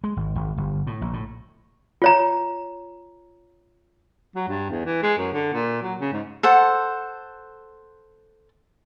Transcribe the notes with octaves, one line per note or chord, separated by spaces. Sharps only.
G#3
G#1
G#1
G1
A2
A#1
A2
F4 C#5 A#5
F#3
G2
E2
E3
G#3
F#2
D3
A#2
F#3
C#3
G#2
A4 C5 F#5